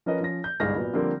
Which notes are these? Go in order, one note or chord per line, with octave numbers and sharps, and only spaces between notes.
F3 C#4 A#4 B4 C#5 D#5
F3 C#4 A#6
G6
G1 C2 G#2 G#4 F6 A#6
A#2 F#3 B3
D3 F3 G3 A#3 C4